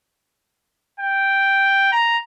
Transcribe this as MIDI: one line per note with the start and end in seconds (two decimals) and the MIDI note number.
1.00 1.87 79
1.92 2.17 82